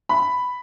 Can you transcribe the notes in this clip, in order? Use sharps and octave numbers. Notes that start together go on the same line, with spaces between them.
B5